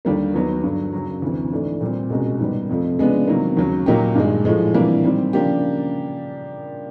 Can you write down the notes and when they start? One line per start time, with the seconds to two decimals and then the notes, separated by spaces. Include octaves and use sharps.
0.05 D#2 D3 G3 A#3
0.34 D#2 D#3 F#3 B3
0.64 G2 D3 F#3
0.93 F#2 C#3 F#3
1.22 D2 C3 E3
1.52 G#2 E3 A3 D4
1.81 A#2 G3 C4
2.10 C2 B2 G#3 C#4 F#4
2.40 G#2 D#3 G3 B3
2.69 F2 C3 F3 A3
2.98 C#3 F3 G#3 B3 D4
3.28 C3 D#3 F#3 A#3
3.57 D#2 C#3 F#3
3.86 A#2 F#3 A#3 D#4 G4
4.15 G2 D#3 G#3
4.45 A2 F3 G#3
4.74 C3 E3 G3 A#3 D4
5.04 D#3 G3 C4
5.33 C#3 F3 A#3 D4 G4